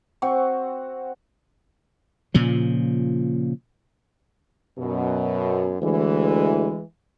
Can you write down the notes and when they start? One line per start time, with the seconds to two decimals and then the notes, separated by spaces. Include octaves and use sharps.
0.22 C4 F#4 C#6
2.34 A#2 C#3 F3
4.79 F#2 B2
5.82 D2 E3 G#3